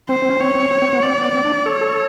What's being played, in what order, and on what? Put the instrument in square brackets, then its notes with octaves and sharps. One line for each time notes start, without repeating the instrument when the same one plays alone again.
[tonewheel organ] C4 [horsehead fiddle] C5
[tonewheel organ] C4
C#4
[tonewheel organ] C4 [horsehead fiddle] C#5
[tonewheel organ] C4
C4
C4
B3
[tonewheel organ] C4 [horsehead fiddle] D5
[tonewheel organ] B3
C4
D4
[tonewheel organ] A4 [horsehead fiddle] C#5
[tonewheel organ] A4